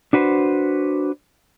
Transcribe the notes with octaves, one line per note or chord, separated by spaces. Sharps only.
D4 F#4 B4 C5